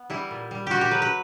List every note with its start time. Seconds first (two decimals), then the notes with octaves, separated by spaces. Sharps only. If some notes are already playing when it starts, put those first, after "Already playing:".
Already playing: B3
0.10 E3 G3 E4
0.31 A#2
0.51 G3
0.67 A#2 F#4 G4
0.81 G4
0.91 F#3 B4
1.02 B4